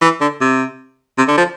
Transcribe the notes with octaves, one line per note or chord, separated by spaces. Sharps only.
E3
D3
C3
C3
D3
F3